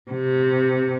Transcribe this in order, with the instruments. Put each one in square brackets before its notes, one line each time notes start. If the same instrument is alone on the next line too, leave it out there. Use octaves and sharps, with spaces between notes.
[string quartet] C3